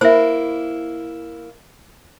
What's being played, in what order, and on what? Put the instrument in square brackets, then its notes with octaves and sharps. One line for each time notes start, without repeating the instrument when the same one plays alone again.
[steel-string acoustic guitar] A#3 E4 [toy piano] C5 E5